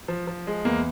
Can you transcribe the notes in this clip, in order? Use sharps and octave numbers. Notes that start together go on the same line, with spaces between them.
F3
F3
G#3
E2 A#3